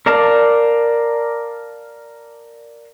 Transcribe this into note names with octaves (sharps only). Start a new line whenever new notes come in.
A#4 D5 F5 A5